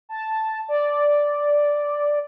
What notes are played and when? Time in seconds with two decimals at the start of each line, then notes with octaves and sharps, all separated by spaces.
0.09 A5
0.69 D5